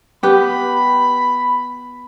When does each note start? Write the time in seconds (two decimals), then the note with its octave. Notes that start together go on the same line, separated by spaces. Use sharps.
0.23 B3 G4 B4 B5